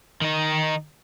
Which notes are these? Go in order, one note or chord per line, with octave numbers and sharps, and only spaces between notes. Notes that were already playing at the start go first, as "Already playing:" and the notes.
D#3 D#4